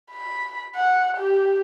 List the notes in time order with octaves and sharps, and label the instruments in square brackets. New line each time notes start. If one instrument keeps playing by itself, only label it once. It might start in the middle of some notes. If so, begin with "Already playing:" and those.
[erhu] B5
F#5
G4